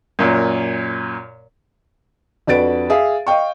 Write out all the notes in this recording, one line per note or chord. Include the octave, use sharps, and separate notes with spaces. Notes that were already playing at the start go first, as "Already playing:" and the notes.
F#2 A#2
F2 D4 F#4 B4 A6 D7
G#4 E5 F5
D#5 F5 G5 C#6